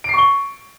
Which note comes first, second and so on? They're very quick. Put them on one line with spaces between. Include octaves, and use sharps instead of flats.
D7 C7 C#6 G7